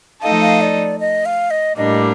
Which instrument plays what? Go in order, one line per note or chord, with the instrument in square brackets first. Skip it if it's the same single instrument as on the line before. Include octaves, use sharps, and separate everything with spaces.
[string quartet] F3 A3 D#4 A4 D#5 [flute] F5
[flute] F5
D5
D#5
F5
D#5
[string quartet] A2 G3 A#3 D4 [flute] D#5